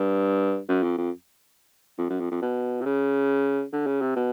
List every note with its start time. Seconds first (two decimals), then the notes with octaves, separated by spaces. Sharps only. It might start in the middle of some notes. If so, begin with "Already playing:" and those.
Already playing: G2
0.69 F#2
0.83 F2
0.97 F2
1.98 F2
2.10 F#2
2.20 F2
2.31 F2
2.42 B2
2.81 C3
2.85 C#3
3.72 D3
3.87 C#3
4.01 C3
4.16 B2